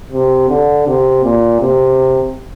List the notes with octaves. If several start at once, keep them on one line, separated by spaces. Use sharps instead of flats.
C3
D3
C3
A#2
C3